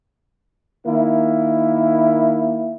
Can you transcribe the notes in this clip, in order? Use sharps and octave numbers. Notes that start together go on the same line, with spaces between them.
D#3 A#3 E4